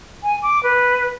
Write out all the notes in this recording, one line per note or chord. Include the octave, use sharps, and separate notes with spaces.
G#5
D6
B4